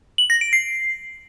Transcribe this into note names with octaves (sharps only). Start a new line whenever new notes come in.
F#7
A#6
D7
C7